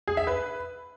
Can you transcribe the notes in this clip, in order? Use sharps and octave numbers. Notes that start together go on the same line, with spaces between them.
G#4
E5
B4